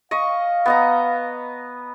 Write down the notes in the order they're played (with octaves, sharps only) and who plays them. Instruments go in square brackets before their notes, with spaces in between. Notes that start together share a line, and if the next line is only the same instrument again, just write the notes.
[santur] D#5 C#6 [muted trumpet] F5
[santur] B3 D#5 A#5